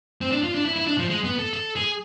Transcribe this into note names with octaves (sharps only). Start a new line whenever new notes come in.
C4
D4
F4
D4
E4
E4
D4
F3
G#3
B3
A4
A4
G#4